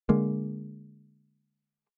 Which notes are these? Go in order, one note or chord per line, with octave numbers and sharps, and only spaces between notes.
D3 G#3 A#3